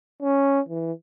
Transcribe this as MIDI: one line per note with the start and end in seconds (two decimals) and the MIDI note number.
0.22 0.61 61
0.69 0.92 52